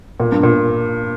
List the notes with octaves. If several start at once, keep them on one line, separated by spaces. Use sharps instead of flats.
A#2
G2
A#2